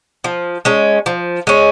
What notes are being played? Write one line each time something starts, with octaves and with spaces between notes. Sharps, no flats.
F3
G#3 C#4
F3
G#3 C#4